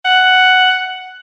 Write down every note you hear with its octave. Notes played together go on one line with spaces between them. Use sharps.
F#5